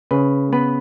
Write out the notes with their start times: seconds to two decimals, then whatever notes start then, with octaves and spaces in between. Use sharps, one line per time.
0.11 C#3 B4
0.53 B3 B4